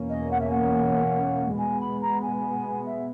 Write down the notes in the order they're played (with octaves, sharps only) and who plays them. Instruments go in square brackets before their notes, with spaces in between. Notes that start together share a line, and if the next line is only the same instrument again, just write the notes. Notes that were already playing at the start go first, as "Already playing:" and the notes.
Already playing: [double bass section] E2 B2 A#3 C#4
[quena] D#5
F#5
E5
F#5
[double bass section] B2 G#3 B3 [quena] G#5
[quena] B5
A#5
G#5
E5